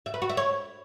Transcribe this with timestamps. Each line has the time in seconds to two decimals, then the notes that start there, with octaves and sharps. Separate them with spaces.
0.06 E5
0.14 B4
0.22 F#4
0.29 E5
0.37 C#5